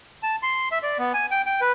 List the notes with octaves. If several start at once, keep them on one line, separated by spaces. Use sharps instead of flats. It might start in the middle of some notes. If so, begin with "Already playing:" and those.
A5
C6
E5
D5
B3
G#5
G5
G5
B4